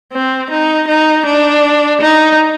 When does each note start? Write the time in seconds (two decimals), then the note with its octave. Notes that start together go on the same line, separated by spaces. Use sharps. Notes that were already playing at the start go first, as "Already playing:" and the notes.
0.12 C4
0.50 D#4
0.87 D#4
1.25 D4
2.01 D#4